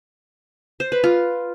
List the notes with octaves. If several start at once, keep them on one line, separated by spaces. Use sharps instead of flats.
C5
B4
F4